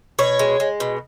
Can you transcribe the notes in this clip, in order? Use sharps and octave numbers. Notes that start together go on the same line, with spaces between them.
B2 C#5
G#3
G#3
B2